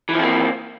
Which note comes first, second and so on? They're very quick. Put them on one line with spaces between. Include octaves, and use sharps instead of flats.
E3 F3 C4 A#3